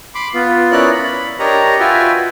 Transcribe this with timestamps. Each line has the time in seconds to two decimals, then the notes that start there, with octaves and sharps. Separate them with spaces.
0.15 B5 C6 D6
0.34 B3 F4
0.72 C#4 E4 A#4 C#5 D5 F#6
0.93 B5
1.39 D4 G4 A#4 C#5 D#5 A#5
1.79 F4 F#4 B4 E5 G5 G#5